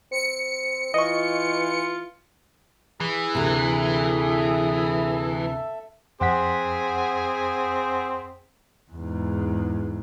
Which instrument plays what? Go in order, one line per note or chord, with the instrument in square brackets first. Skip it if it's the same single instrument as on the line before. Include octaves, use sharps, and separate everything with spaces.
[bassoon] C4 [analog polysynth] C#7
[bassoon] E3 [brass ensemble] F4 [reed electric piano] D#5 C#6
[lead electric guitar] E3 [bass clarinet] G#4
[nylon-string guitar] D2 C3 [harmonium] A4 E5
[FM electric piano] F2 F#5 B6 [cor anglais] C4 [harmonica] G#4
[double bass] E2 G#2